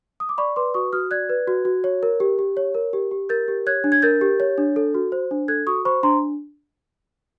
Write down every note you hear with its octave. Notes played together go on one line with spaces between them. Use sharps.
D#6
D6
D5 B5 C#6
B4 C6 D6
F#4 C#6 D#6
F#4 D#6 F6
D5 F#6 G#6
B4
F#4
F#4
C#5
A#4
G4
G4
C#5
A#4
G4
G4
A#4 G6 A6
G4
C#5 F#6 G#6
D4
G#6
A#4 G6 A6
G4
C#5
D4
A4
F#4
C5
D4
A4 F#6 G#6
F#4 C#6 D#6
C5 B5 C#6
D4 A#5 C6